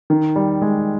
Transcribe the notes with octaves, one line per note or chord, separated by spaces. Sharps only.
D#3
G3
G#3